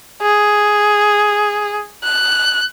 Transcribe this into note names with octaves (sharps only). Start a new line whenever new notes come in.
G#4
F#6